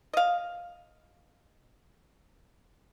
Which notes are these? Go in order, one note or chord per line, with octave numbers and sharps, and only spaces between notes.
D#5 F5